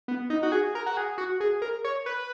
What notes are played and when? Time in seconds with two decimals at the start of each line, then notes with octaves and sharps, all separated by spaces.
0.08 B3
0.30 D#4
0.43 F#4
0.52 G#4
0.75 A#4
0.86 F#4
0.97 G#4
1.18 F#4
1.40 G#4
1.62 A#4
1.84 C#5
2.06 B4